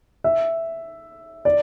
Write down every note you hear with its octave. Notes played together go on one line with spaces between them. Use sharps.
E5
D5